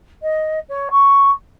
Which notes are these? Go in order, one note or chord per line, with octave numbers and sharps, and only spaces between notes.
D#5
C#5
C#6